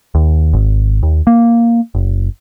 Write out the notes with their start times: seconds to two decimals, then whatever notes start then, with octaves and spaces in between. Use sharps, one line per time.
0.15 D#2
0.53 G#1
1.03 D#2
1.27 A#3
1.95 F#1